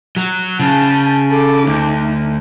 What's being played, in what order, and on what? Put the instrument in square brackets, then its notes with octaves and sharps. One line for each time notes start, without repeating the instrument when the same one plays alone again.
[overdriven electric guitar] F#3
[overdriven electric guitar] C#3 [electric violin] A5 G6
[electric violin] A4 D6
[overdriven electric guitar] D2 [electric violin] D#4